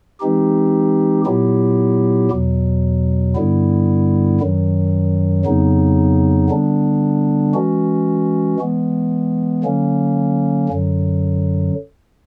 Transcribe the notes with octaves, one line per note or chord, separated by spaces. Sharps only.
E3 G#3 C4 D#4 G4
A#2 F#3 B3 E4 G4
E2 B2 F#3
G2 D3 G3 B3 E4
F#2 D#3 F#3
F2 C#3 F#3 B3 D#4
D3 G3 B3 D4
E3 G#3 C#4 F#4
E3 G#3 B3
D3 F#3 A#3 C#4
F#2 D3 F#3